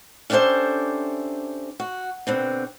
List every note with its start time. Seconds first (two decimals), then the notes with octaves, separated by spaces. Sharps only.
0.30 C#4 D4 G4 A4 C5 E5
1.80 F#4
2.27 B2 D3 C4